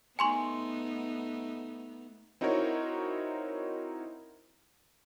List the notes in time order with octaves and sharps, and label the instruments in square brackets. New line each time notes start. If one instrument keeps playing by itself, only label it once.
[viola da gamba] A3 B3 D#4 [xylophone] G#5 C6 C#6
[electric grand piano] C4 D#4 E4 F#4 A#4 C#5